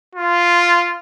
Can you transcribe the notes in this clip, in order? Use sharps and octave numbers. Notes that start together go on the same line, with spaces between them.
F4